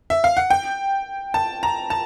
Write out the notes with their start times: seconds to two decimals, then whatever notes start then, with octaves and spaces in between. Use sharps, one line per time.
0.10 E5
0.24 F5
0.37 F#5
0.50 G5
1.34 A5
1.63 A#5
1.90 A5